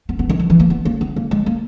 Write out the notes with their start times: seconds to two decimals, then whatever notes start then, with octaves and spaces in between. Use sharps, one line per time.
0.09 B3
0.19 B3
0.29 D#3
0.39 E3
0.50 E3
0.60 A#3
0.70 B3
0.85 A#3
1.01 B3
1.16 A#3
1.31 G#3
1.46 A#3